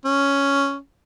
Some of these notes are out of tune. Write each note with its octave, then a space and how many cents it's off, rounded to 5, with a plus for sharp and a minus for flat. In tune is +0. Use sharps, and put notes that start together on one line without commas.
C#4 +5